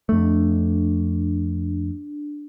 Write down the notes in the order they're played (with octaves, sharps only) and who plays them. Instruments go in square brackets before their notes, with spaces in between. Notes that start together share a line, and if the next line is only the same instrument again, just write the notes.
[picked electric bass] F2 A3 [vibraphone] D4